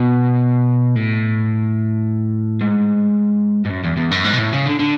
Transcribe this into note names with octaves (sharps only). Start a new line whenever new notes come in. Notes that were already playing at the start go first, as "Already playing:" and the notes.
Already playing: B2
A2
G#2
G#2
F#2
E2
E2
F#2
G#2
B2
A2
C#3
D3
D3